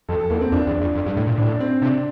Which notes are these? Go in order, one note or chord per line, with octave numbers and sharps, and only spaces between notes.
F2 A4
A4
E2 A#3
C4
F2 D4
E2
F2
F2
G2
A2
A#2
A2 D4
C4
C3 D4